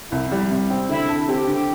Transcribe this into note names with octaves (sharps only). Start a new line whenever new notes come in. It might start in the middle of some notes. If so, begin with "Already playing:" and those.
C2 E4
G3
C3
C4
D3 E4
A4
C4 G4
D3